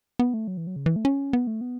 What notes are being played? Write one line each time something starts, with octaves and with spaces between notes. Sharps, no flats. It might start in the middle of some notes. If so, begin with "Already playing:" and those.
B3
A3
F#3
E3
F#3
C#3
E3
A3
C#4
B3
A3
B3